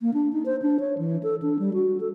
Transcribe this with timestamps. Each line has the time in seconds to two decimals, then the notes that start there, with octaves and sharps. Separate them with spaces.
0.01 A#3
0.14 D4
0.33 D#4
0.46 C5
0.62 D4
0.80 C#5
0.98 E3
1.23 A4
1.42 D4
1.59 G3
1.73 F#4
2.00 A4